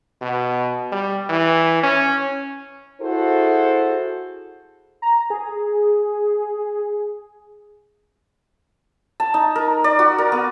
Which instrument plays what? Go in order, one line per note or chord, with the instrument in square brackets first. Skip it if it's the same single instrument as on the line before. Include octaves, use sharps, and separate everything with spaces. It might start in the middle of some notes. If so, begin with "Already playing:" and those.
[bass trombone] B2
G3
E3
C#4
[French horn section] E4 F#4 G#4 A4 C5
[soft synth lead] A#5
G#4
[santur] A5
D#4
A#4
D5
F#4
A#4
B3